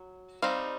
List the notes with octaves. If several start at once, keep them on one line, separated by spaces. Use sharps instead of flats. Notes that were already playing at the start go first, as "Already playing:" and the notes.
Already playing: F#3
G3 C4 D#4 F5